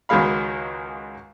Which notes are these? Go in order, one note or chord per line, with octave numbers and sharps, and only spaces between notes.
C#2 D#3 F#3 G#3 F5 B5